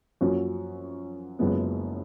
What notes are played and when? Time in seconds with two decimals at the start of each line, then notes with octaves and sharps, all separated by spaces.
0.21 F#2 F3 A#3 C#4 F#4
1.39 F#1 F#2 F3 G#3 B3